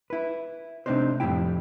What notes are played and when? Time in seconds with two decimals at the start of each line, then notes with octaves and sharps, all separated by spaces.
0.10 E4 B4
0.86 C3 A3 C4 D4 D#4 C5
1.20 F2 A2 F3 G3 E4 G5